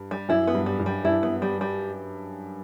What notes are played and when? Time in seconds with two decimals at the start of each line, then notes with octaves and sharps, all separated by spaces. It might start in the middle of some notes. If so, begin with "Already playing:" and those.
Already playing: G2
0.11 G3
0.29 F#2 E4
0.47 B3
0.55 G2
0.66 G3
0.79 G2
0.86 G3
1.04 G2 E4
1.23 B3
1.42 G3
1.61 G3